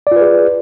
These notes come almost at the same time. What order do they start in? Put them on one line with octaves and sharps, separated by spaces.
D5 F4 B4 G#4